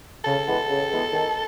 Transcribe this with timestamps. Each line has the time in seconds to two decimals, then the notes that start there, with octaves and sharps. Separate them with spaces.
0.24 C#3 A4
0.46 E3 G#3 B3
0.69 C#3
0.91 E3 G#3 B3
1.12 D#3